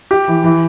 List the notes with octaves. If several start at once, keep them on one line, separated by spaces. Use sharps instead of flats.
G4
E3
E3